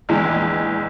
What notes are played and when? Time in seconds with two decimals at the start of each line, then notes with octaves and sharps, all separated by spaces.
0.09 A#1 E2 E3 G#3